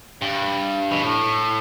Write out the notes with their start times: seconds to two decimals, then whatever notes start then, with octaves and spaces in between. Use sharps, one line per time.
0.22 G2
0.91 B2
1.02 A2